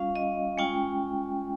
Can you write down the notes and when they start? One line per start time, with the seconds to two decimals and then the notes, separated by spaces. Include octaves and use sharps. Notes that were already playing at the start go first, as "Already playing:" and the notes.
Already playing: G3 C#4 F4 F5
0.15 D#5
0.58 G#3 C#4 F4 G5